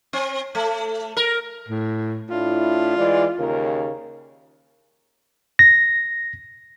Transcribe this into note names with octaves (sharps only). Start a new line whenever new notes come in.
C4
A3
A#4
A2
A2 D4 E4 F4
E3 G#3 D5
D#2 C#3 A#4
A#6